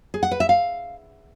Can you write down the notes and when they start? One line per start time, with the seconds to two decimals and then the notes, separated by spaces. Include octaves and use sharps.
0.14 G#4
0.23 F#5
0.31 B4
0.40 E5
0.49 F5